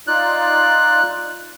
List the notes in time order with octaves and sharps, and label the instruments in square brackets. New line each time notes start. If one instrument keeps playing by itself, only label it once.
[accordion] D#4 F4 D5 [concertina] F#6